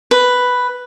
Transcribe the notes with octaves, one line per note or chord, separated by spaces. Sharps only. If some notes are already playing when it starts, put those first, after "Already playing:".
B4